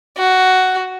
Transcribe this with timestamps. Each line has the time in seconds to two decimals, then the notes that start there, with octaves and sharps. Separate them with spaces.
0.18 F#4